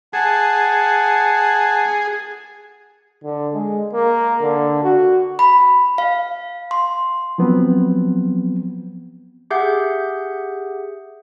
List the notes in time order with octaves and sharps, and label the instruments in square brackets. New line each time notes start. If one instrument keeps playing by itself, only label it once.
[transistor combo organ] G#4 [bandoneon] F#5 A5
[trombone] D3
G#3
A#3
D3
F#4
[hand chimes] B5
F5
C6
[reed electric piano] F3 F#3 B3 C4
[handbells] G4 G#4 E5 F#5 G6 C7